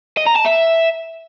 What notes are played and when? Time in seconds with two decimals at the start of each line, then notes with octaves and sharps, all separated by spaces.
0.17 D#5
0.26 A#5
0.36 A5
0.45 E5